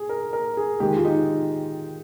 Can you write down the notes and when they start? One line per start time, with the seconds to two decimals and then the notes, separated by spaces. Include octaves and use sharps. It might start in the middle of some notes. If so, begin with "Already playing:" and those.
Already playing: G#4
0.09 A#4
0.33 A#4
0.57 G#4
0.80 D#3 G#3 G4
0.96 F4
1.05 D#4